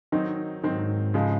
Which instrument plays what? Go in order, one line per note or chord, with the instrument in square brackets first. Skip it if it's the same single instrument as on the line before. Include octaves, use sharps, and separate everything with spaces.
[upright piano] D#3 F#3 C4 D#4
[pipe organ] G#2 [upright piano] D#3 F#3 C4 D#4
[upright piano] C#3 F3 G#3